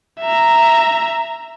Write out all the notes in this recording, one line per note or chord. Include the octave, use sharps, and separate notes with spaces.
E5 A#5